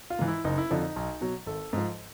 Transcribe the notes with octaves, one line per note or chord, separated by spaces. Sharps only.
F4
G#2 E3
E4
F#1 D#4
E4
F2 D3 F3 D#4
B1
B2 F#3
G#1 A4
G#2 F3